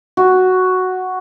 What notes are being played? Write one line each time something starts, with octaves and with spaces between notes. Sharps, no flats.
F#4